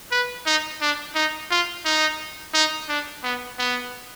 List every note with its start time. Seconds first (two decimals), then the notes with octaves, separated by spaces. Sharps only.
0.11 B4
0.46 D#4
0.81 D4
1.15 D#4
1.50 F4
1.85 D#4
2.54 D#4
2.89 D4
3.23 B3
3.59 B3